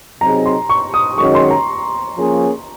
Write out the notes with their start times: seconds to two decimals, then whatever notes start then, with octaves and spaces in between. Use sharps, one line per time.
0.21 C3 F#3 C4 D#4 G#4 A#5
0.46 C6
0.69 C#6
0.94 D#6
1.17 F#2 D#3 G#3 C#4 F#4 C#6
1.35 C6
1.51 A#5
2.15 F3 A#3 C#4 G#4